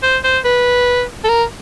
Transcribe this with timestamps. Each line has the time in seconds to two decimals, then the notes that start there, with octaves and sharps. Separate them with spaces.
0.03 C5
0.24 C5
0.45 B4
1.24 A4
1.29 A#4